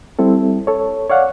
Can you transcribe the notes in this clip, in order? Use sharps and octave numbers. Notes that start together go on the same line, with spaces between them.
G3 C4 E4 A4
A4 C#5
C#5 D5 F5 F#5